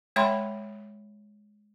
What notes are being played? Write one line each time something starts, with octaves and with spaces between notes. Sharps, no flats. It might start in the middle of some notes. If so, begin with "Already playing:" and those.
G#3 C#5 E5 G5 B5 C6